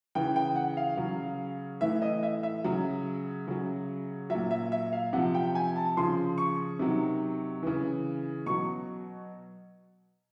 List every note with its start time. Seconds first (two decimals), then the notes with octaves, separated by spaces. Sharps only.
0.15 C#3 E3 G5
0.36 G5
0.56 F#5
0.77 F5
0.97 C#3 F#3
1.81 A2 E3 E5
2.02 D#5
2.23 E5
2.43 E5
2.64 C#3 F#3
3.47 C#3 F#3
4.30 A#2 F#3 E5
4.51 E5
4.72 E5
4.93 F5
5.13 C3 F3 F#5
5.35 G5
5.55 G#5
5.76 A5
5.97 C#3 F3 C6
6.38 C#6
6.79 C3 D#3 F#3
7.63 C#3 E3
8.46 B2 F#3 C#6